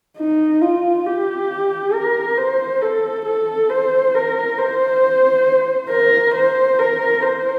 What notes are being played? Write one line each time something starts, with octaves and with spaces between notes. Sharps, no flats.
D#4
F4
G4
A#4
C5
A4
A4
C5
A#4
C5
A#4
C5
A#4
C5